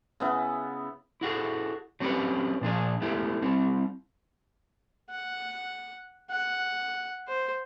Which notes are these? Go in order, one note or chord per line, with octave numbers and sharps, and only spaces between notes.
C#3 B3 E4
E4 F#4 G#4 A4
F#3 C4 C#4 G4 B4
A#2 F3 D4 G#4
G#3 A3 B3 E4 G4
G3 C4 E4
F#5
F#5
C5